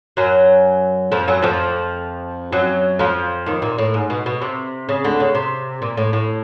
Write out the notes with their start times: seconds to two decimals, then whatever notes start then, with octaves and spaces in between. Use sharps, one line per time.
0.17 F#2 F#3
1.12 F2 F3
1.28 F#2 F#3
1.42 F2 F3
2.52 F#2 F#3
2.99 F2 F3
3.46 D#2 D#3
3.62 A#2
3.78 A2
3.94 G#2
4.10 B2
4.26 B2
4.41 C3
4.89 C#3
5.04 D2 D3
5.20 C#3
5.35 C3
5.82 A#2
5.97 A2
6.13 A2